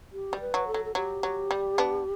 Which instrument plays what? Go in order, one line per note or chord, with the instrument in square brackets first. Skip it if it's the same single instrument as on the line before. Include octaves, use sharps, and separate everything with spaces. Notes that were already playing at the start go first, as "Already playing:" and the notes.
[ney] G4
[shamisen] G3
[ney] B4
[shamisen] F#3
[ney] A4
[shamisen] F#3
[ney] A4
[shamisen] F#3 [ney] G4
[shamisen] F#3
G3
B3 D4